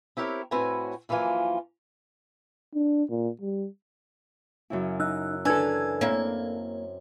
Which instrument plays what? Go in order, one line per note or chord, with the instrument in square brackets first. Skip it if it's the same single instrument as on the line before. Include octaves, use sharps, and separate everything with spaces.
[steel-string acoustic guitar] C4 E4 G4 A#4 C#5
A2 C4 F#4 B4 C#5 G#5
F#2 E3 F3 A#3 F4 G#5
[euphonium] D4
A#2
G3
[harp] F#2 C#3 E4
[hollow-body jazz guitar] D#4 [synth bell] E6 F#6
[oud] E3 [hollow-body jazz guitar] D4 A4 [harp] B4 [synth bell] G#5 E6 G#6
[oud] A#3 E4 [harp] C4 [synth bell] C#5